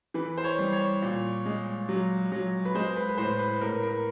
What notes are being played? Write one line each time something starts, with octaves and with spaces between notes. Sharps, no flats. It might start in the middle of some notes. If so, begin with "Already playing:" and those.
E3 B4
C5
C#5
G3
C#5
A#2
G#3
F#3
F#3
B4
G#3 C5
B4
B4
A2 C5
B4
A2 A#4
B4
A#4